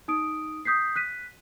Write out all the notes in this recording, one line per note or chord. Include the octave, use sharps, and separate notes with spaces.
D#4 D#6 D7
D#6 G6 B6 C7
F#6 B6 D#7